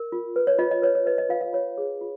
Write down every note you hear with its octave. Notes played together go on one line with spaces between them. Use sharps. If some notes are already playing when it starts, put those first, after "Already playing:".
Already playing: A#4
F4
B4
C#5
F4 D#5
D#5
B4 C#5
C#5
B4 D#5
D#5
F4 F5
F5
F4 C#5
G#4
F4